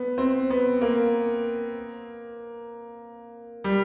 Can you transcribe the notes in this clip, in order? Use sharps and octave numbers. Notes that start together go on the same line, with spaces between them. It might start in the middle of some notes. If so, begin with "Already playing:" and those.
Already playing: B3
C4
B3
A#3
G3